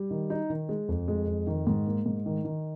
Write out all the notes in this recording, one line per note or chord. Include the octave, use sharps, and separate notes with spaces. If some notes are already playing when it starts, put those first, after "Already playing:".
Already playing: G3
D#3
D#4
D#3
G#3
F2
G#3
F2
D#3
G#2
A#3
G#2
D#3
D#3